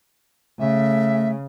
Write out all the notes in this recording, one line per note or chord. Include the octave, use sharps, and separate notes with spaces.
C#3 A3 E5